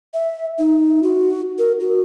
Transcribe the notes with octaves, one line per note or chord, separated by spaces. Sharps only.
E5
D#4
F#4
A#4
F#4